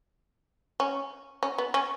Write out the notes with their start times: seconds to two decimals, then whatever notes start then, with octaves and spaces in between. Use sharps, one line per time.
0.80 C#4
1.43 C#4
1.58 B3
1.74 C#4